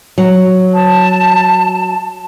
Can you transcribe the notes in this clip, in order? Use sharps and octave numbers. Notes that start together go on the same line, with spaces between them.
F#3
A5